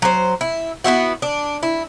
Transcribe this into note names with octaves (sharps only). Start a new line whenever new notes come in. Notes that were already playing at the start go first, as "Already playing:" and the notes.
F#3 C5
E4
B3 C4 E4 F#4
D4
E4